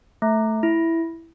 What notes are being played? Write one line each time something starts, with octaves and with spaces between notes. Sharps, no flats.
A3
E4